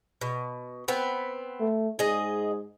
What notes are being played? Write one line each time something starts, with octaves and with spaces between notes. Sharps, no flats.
B2
B3 C4 B4
A3
G#2 G#4 D#5